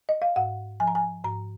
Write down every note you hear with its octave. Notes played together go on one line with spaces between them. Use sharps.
D#5
F5
G#2 F#5
F3 G#5
A#5
G#5
G#2 A#5